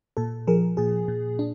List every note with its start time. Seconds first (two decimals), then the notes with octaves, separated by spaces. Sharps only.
0.17 A#2 A4
0.47 F3 G#4 A#4
0.77 A#2 G#4
1.08 A#2
1.39 D4